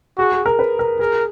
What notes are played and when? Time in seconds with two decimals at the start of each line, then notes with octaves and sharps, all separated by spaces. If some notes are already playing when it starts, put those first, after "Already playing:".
0.18 F#4 G#4
0.32 G#4
0.46 A#4
0.59 B4
0.79 A#4
0.99 G#4 A#4